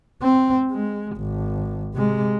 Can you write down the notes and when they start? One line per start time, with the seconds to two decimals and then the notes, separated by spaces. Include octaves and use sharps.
0.23 C4
0.71 G#3
1.17 G#1
1.94 C3 G#3